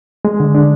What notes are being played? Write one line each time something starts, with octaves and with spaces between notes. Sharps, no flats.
G#3
D3
D4